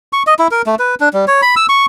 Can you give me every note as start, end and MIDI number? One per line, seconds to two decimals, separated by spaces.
0.13 0.23 85
0.27 0.34 75
0.39 0.48 64
0.51 0.62 70
0.66 0.75 57
0.79 0.95 71
1.00 1.09 62
1.13 1.25 55
1.28 1.41 73
1.42 1.55 83
1.56 1.66 88
1.69 1.86 85